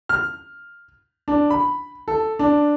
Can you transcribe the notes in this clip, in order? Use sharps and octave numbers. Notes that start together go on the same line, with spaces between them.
F6
D4
B5
A4
D4